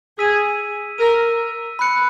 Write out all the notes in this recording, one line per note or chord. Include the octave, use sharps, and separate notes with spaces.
G#4 E6 B6 D#7
A#4 E6 B6 D#7
B5 F#6 C#7